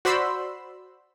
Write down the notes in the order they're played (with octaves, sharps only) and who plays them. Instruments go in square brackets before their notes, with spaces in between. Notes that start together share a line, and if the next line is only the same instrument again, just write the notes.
[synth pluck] F#4 C5 D5 B5 C6 E6